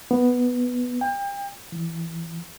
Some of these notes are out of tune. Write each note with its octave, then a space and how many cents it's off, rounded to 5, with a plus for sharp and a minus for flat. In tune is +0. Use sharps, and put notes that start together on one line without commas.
B3 +0
G5 +35
E3 +10